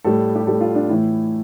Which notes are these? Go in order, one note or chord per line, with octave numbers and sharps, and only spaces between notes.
A2 G3 A4
G4
A2 G3 A4
F4
D4
A2 E3 A3 E4